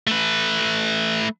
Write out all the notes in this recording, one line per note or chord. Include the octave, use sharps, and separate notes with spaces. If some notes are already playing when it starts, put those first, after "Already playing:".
A3 B4